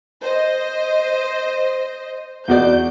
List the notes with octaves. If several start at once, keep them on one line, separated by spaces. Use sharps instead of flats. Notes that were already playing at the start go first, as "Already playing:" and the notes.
C5 D#5
E2 F#4 D5 G6